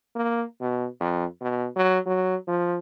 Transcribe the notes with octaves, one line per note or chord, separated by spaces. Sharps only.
A#3
B2
F2
B2
F#3
F#3
F3